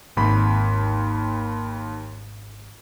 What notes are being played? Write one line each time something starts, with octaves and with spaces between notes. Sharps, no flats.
G#1 D#2 B5